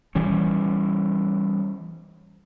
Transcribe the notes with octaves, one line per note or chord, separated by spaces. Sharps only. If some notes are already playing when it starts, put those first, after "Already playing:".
E3 G3 C#4